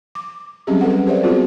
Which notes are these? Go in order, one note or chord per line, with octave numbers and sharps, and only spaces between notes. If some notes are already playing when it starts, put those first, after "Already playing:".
D6
F#3 G3 C4 C#4 G4 G#4
A4 B4 F#5
G4 G#4 A#4 C5 D5 E5
B3 C4 F4 F#4 G#4 A4